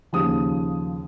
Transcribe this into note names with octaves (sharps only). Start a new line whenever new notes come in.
D#2 C#3 F3 D#6